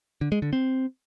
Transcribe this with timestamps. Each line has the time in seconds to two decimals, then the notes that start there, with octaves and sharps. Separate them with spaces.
0.21 D3
0.32 G#3
0.42 D3
0.53 C4